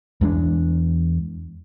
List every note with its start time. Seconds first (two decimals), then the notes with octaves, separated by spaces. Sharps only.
0.21 E2 G#3 C#4 D4